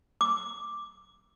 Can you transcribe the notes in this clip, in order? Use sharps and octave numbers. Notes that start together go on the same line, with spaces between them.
D6